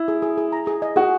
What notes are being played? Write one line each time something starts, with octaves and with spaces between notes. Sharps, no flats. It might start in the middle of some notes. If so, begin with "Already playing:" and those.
Already playing: E4
G#4
G#4
G#4
A#5
G#4
D#5
F#4 G#4